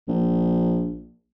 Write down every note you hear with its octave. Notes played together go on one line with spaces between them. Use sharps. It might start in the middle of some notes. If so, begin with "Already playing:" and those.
A#1